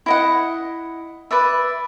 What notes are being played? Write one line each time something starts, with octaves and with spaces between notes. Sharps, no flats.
E4 D#5 F#5
B4 D5 E5